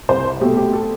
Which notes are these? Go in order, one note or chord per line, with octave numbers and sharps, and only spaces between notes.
C2 C5
B2 A3 G4
G4
A4